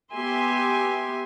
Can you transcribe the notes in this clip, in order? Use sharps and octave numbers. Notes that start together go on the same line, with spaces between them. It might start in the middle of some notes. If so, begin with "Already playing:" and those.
B3 G4 E5 G#5 C6